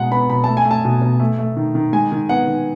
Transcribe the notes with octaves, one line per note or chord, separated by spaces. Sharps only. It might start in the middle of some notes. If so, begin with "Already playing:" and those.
Already playing: B2 G#3 F#5
B3 B5
B2 B5
A3 A5
G#5
A3
A5
B2
B2
A3
A3
D#3
D#3
G#3 G#5
D#3
B3 F#5
D#3